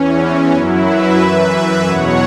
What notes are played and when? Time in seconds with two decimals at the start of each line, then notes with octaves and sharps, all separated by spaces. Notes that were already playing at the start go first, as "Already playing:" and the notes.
Already playing: E2 E3 C#4
0.51 F#2 F#3 E4
0.84 B4 E5
1.18 F#2 E3
1.84 E2 B2 F#3 C#5 F#5